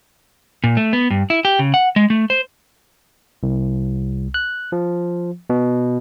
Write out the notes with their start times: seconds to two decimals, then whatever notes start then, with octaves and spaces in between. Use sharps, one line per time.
0.64 A#2
0.77 A3
0.93 B3
1.10 G2
1.30 E4
1.45 G4
1.59 C#3
1.74 F#5
1.96 G#3
2.10 A3
2.30 C5
3.43 C2
4.34 F#6
4.72 F3
5.50 B2